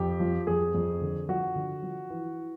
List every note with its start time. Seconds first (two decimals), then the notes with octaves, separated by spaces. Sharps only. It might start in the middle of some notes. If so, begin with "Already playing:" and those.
Already playing: F2 G4
0.20 F3
0.47 F2 G#4
0.75 F2
1.01 D3
1.29 F3 F#4
1.56 D3
1.83 F3
2.10 E3